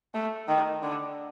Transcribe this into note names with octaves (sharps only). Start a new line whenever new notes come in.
A3
D#3
D3